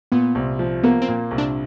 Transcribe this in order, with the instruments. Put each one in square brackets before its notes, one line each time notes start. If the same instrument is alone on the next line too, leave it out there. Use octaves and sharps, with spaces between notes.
[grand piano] A#2 [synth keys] B3
[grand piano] C2
F3
[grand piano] A#3 [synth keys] B3
[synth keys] C4
[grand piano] A#2
C2
[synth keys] D4